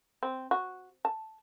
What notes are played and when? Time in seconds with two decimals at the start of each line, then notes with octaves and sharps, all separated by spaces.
0.23 C4
0.51 F#4
1.05 A5